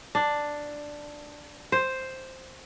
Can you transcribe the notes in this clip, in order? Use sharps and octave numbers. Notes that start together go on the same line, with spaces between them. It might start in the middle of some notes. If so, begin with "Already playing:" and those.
D4
C5